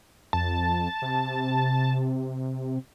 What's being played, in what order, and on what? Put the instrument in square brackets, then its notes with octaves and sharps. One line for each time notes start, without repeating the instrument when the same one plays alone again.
[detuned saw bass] F2 [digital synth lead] A5
[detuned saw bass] C3